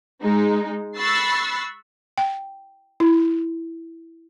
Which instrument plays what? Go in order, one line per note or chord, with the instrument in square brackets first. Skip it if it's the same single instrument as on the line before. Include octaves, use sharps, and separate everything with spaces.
[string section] G#3 D#4
B5 C#6 E6 F#6 A6 C7
[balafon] G5
E4